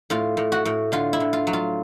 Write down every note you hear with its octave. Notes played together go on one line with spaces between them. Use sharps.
A2 F4
A2
F#4
A2
D3 F4
E4
D3
F4
F#3
F4